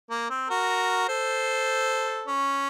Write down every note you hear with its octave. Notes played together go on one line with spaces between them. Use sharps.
A#3
C4
F#4 A#4
A4 C5
C#4